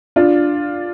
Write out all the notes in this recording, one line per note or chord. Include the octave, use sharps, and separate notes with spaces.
D4 F4